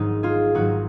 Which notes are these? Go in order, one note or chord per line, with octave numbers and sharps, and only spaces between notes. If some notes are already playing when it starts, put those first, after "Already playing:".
Already playing: G#1 G#2 F#3 D#4
F4 G#4
G#1 G#2 F#3 D#4 F#4